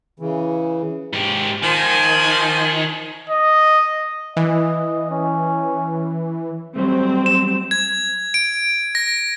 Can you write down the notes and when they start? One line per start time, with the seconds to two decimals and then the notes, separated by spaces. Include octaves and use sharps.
0.20 C#3 E3
1.13 G#2 G4
1.63 D#3 F3 G#5
3.30 D#5
4.37 E3 D#5
5.11 C#4
6.76 F#3 G3 A3 C4
7.26 E7
7.71 G#6
8.34 D7
8.95 A#6